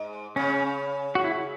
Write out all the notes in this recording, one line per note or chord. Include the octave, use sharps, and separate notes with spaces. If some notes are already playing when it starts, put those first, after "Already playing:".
Already playing: G#2
C#3 C#4
F#4
E4